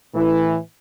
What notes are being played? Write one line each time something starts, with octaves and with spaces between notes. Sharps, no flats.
A2 E3